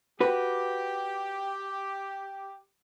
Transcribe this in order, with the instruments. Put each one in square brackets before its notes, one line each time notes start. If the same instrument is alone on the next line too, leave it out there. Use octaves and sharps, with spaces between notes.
[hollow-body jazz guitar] F#4 B4 [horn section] G4